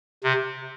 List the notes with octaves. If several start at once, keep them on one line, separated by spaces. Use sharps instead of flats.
C3